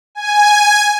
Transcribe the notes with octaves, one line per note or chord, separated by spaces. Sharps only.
G#5